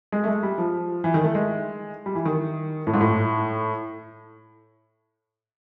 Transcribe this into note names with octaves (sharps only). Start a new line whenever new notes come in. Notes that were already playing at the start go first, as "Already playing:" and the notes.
G#3
A3
G#3
G3
F3
E3
D#3
A3
G#3
G3
E3
D#3
A2
G#2
A2